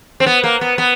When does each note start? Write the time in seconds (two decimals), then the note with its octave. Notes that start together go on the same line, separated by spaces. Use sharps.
0.20 C4
0.26 B3
0.44 A#3
0.61 B3
0.78 B3